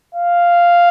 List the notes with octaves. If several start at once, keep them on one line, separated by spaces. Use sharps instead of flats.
F5